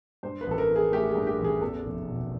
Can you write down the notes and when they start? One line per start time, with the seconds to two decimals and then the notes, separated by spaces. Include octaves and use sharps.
0.23 G2 C5
0.41 B4
0.46 A1 A4
0.58 A#4
0.69 E3
0.76 G#4
0.92 A3 G4
1.09 G#4
1.15 G2
1.27 G4
1.39 A1
1.44 G#4
1.61 E2 A4
1.84 F1
2.07 B2